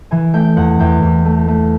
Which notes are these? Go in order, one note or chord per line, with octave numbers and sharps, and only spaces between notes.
E3 G#5
A3 G5
E2 F#5
E2 G5
E2
A3
A3